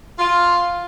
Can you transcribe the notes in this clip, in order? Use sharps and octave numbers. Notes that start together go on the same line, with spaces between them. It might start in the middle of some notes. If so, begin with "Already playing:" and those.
F4